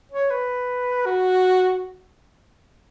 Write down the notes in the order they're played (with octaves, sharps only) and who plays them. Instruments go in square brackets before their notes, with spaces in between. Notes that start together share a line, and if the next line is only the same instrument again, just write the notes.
[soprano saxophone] C#5
B4
F#4